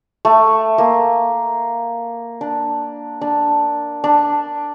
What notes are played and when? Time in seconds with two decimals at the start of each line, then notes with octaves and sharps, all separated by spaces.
0.25 A3
0.78 A#3
2.41 D4
3.21 D4
4.04 D4